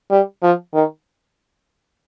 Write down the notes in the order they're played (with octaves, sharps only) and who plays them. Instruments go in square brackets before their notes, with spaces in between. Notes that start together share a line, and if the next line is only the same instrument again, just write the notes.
[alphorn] G3
F3
D#3